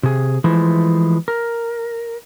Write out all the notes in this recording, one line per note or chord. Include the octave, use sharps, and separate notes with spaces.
C3 G#4
E3 F3 G#3 A3 E4
A#4